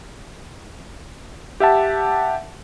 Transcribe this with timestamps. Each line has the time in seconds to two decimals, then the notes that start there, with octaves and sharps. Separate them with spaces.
1.60 G4 E5 F#5 A5